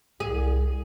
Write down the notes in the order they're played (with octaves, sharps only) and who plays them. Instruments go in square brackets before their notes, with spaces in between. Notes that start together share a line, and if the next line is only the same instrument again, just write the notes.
[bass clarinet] C2 [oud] G#4